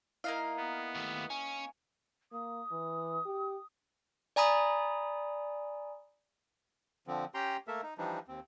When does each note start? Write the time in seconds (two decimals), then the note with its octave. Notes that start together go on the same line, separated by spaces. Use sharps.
0.24 A#3 D#4 E4 E5 F5 C7
0.56 B3
0.95 D#2 A3
1.30 C#4 G#5
2.32 A#3 D#6
2.71 E3
3.26 G4
4.36 D5 G#5 A#5 B5 D#6
7.07 D3 F3 C4
7.34 C#4 G4 G5 A#5 C6
7.68 A3 A#3 A4 A#4 E5
7.83 D#4
7.98 E3 F3 G3 D4 D#4
8.28 D#2 C4